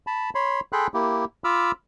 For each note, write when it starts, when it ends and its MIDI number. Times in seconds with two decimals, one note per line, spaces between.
0.07 0.30 81
0.07 0.30 83
0.35 0.60 73
0.35 0.60 83
0.35 0.60 84
0.73 0.87 68
0.73 0.87 69
0.73 0.87 79
0.73 0.87 83
0.73 0.87 84
0.73 0.87 90
0.94 1.25 58
0.94 1.25 64
0.94 1.25 67
1.44 1.72 65
1.44 1.72 83
1.44 1.72 86
1.44 1.72 88
1.44 1.72 89